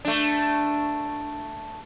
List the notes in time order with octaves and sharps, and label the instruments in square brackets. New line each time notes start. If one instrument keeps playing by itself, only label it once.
[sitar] A3 D4